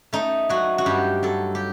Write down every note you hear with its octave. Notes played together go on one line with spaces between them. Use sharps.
A3 D#4
F#3 F#4
F#4
G2 G4
F#3 A4
G4